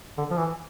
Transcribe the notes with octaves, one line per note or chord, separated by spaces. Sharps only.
D3
F3
E3